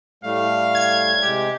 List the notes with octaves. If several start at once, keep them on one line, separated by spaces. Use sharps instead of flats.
A2 G3 A3 F5
G#6
C3 G#3 G4